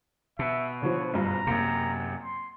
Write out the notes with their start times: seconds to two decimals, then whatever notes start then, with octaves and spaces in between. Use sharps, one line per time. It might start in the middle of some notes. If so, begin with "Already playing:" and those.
0.39 B2 E5
0.82 D3 F3 C#5
1.14 F#1 G2 F4 A#5
1.47 F#2 C3 A#3
2.23 C6